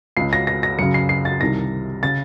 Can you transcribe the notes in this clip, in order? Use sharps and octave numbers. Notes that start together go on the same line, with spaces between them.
C#2 C#3 C7
A#6
A#6
A#6
F#2 C#3 C#7
C7
C7
A6
C2 C3 D#3 A#6
C#3 A6